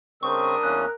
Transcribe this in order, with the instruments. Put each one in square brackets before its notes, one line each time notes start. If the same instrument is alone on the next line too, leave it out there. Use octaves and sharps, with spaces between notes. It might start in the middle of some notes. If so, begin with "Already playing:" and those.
[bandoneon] C#3 C4 [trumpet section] G3 D4 D#6 [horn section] A#4 [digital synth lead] C#6
[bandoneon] E2 A#3 C#4 [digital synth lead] F#6